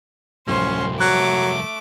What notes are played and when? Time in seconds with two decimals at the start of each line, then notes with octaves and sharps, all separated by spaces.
0.48 D1 C2 F2 C#4 C5 C6
1.00 F#3 A3 D6 F#6